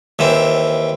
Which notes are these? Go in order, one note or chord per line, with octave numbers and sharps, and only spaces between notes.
D#2 E3 C4